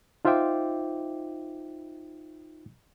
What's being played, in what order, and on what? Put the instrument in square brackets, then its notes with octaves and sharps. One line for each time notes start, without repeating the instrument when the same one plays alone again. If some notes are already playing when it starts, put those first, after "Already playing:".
[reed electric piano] D#4 F4 C5 E5 G5 D6